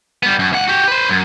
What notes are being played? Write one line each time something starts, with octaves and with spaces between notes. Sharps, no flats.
G3 B3
F#2
C#2 F#5
F#4 G4
B4 C5
F#2